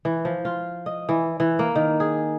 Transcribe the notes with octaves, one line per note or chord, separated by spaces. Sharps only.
E3
F3
F4
D#5
E3
E3
A#3
D#3
G#4